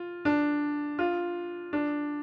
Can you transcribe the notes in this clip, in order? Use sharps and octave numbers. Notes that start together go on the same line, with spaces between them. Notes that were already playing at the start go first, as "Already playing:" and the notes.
Already playing: F4
D4
F4
D4